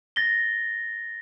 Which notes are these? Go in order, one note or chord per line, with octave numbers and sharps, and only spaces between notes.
A6 A#6 G7